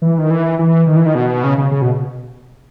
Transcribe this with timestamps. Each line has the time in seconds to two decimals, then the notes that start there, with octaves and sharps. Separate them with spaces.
0.02 E3
0.18 D#3
0.30 E3
0.59 E3
0.87 D#3
0.96 E3
1.06 D#3
1.15 B2
1.44 C#3
1.58 C#3
1.71 C#3
1.82 B2